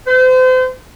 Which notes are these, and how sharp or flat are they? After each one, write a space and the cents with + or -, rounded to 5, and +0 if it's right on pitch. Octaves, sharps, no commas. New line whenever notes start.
C5 -35